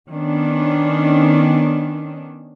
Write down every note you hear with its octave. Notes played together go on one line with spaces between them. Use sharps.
D#3 B3 C#4 D4